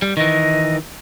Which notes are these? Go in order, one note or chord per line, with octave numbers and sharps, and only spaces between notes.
G3
D#3 E3 D#5